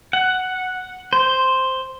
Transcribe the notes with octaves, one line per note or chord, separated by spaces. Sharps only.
F#5
C5